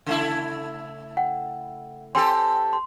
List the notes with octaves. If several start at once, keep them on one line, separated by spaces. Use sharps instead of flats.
C#3 A3 E4
F#5 G5
C4 G4 A4 G5 G#5 C6
C6